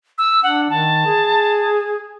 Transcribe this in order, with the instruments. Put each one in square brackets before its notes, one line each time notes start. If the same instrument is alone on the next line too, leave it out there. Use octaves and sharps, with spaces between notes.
[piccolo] E6
[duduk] D4 [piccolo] F#5
[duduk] D#3 [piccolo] A5
[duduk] G#4